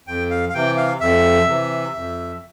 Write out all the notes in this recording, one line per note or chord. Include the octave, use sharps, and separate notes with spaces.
F2 G5
F5
F5
C3 E3 G5
F5
F2 E5
C3 E3
F2